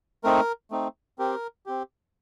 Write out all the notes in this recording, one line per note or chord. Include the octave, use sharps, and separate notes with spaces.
A3 C4 D#4 A#4
A3 C4 D#4
C4 G4 A#4
C4 G4